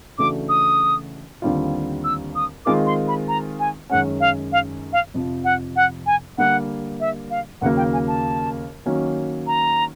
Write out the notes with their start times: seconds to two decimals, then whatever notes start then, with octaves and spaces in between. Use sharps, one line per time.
0.18 C#3 E3 A3 D4 F#4 D6
0.49 D#6
1.42 D#2 D3 G3 C4 F4
2.04 E6
2.35 D#6
2.65 D#3 G#3 C4 F4 A#4 D6
2.86 C6
3.08 B5
3.28 A#5
3.60 G#5
3.90 F#2 D#3 G#3 C#4 F#5
4.20 F5
4.52 F5
4.93 F5
5.14 F2 C3 F3
5.44 F#5
5.76 F#5
6.06 G#5
6.38 D3 G3 A#3 F#5
7.00 E5
7.30 F5
7.61 D#2 C#3 F#3 A#3 F#5
7.77 G5
7.93 G#5
8.08 A5
8.86 D#3 F#3 A#3 C#4
9.47 A#5